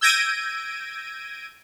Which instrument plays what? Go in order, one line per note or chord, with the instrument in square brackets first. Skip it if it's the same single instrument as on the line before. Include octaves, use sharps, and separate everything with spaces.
[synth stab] E6 G6 G#6 A#6 D7 D#7